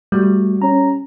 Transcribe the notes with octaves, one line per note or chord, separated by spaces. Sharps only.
G3 A3 F#4
C#4 A#5